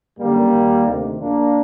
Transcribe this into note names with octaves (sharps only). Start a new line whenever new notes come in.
F#2 D3 G3 A#3
D#2 D#3
D2 C3 D#3
A#1 A#2 A#3 D4